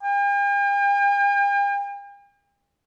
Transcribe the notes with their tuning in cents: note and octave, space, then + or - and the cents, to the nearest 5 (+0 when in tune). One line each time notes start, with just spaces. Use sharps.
G5 +45